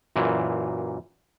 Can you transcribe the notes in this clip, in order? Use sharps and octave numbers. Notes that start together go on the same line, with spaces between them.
F#2 A#2 E3